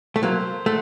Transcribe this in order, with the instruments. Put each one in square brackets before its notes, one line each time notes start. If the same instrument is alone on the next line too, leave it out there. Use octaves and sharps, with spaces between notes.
[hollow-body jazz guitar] A3
[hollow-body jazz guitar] F#3 A#3 [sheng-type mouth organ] C5
[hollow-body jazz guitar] A3 [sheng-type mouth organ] F#5